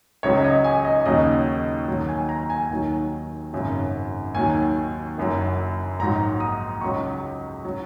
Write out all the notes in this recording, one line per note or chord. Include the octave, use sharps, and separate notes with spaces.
C#2 C#3 F#3 C#5
D#5
G#5
D#5
D#2 C#3 F#3 D#5
D#2 D#3 F#3
G#5
A#5
G#5
D#2 D#3 F#3
G#1 F#2 C#3 F#3
D#2 D#3 F#3 G#5
F#1 F#2 F#3
A#1 G#2 F#3 A#5
D#6
C#2 C#3 F#3 C#6
F#3